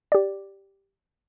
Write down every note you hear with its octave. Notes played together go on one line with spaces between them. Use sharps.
G4 D5